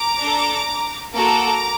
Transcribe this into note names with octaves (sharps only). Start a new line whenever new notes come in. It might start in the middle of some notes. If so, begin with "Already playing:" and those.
Already playing: A#5 D6
D4 A4
A#3 F#4 A4 A#5 D6